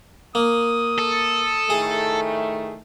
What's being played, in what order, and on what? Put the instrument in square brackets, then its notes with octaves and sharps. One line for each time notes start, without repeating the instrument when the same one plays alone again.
[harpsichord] A#3 [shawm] D#6
[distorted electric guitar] A4
[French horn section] A2 D#3 A3 [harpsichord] G#4